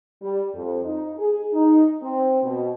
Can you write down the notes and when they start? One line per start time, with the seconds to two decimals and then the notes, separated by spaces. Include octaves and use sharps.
0.21 G3
0.54 F2
0.85 D#4
1.18 G#4
1.53 D#4
2.02 C4
2.43 B2